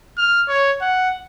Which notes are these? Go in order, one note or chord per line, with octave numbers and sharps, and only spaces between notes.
F6
C#5
F#5